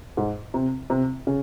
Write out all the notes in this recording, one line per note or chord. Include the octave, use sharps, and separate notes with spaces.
G#2
C3
C3
C#3